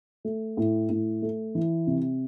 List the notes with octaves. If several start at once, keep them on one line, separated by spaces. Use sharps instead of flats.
A3
A2
A2
A3
E3
C3